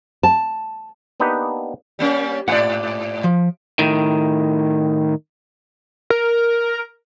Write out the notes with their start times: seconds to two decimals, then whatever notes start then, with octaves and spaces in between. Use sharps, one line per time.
0.23 A5
1.20 A#3 B3 D4 D#4 G4 B4
1.99 G3 A#3 C#4
2.48 G#2 D5 F#5
3.24 F3
3.79 A2 D#3
6.10 A#4